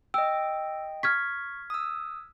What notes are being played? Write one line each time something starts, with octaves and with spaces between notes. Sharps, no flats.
D#5 G5 E6
C#6 F6 G#6 B6
D#6 E6